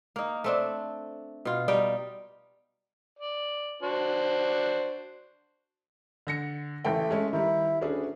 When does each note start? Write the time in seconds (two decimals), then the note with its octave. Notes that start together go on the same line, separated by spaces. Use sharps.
0.16 A#3 D#4
0.44 A3 C4 D4
1.45 B2 F4
1.68 G3 D#4 G5
3.19 D5
3.82 D4 F#4 C5
6.27 D3 A#6 C#7
6.85 A1 A3 G5
7.10 G#3 C#4
7.33 D#3 G3 E4
7.81 D2 C#4 D4 G#4